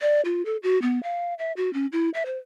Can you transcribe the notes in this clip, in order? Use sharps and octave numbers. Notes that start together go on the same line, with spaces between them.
D5
F4
A4
F#4
B3
F5
E5
F#4
C#4
E4
E5
C5